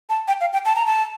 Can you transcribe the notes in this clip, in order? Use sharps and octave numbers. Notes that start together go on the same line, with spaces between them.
A5
G5
F5
G5
A5
A#5
A5